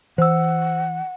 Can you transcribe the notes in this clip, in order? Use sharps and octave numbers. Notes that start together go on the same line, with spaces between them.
E3 C5 F#5 E6